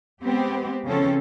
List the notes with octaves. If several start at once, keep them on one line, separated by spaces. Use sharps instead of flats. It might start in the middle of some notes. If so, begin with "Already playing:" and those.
G#3 B3 C4 G4
C#3 E3 F3 C4 C#4 A4